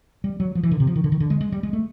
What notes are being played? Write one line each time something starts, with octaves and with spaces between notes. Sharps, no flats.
G3
F#3
F3
E3
D3
C3
F3
D#3
D3
D#3
D3
G#3
G#3
G3
G#3
A3